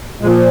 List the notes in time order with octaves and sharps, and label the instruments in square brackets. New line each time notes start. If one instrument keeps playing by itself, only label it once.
[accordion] A#2 F3 G#3